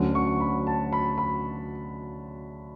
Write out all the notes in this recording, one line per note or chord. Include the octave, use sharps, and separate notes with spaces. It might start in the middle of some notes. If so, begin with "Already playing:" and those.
Already playing: D2 D3 F#3 C#4
C#6
B5
A5
B5
B5